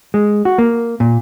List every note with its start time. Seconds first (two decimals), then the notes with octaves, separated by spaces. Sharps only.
0.14 G#3
0.45 F#4
0.58 A#3
1.00 A#2